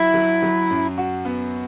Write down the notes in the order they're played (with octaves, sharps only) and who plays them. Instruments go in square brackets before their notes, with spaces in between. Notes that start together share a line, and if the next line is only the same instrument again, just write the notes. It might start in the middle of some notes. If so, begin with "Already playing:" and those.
Already playing: [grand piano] F#3 [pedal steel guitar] E4
[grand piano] F#3
F#3
F#2
F#4
B3